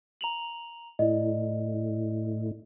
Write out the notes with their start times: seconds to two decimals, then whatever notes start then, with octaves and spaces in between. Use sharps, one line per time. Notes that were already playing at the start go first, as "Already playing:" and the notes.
0.21 A#5 F7 F#7
0.99 A2 E4 D5 D#5